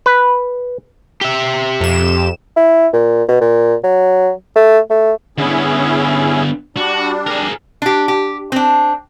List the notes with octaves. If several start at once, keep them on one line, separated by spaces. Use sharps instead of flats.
B4
G4 E5
F2 E7
E4
A#2
B2
A#2
F#3
A3
A3
D3 B3 C#4 E4 G#4
G3 D4 F#4
G#4 A#4
D4 G4
G4
C4 D4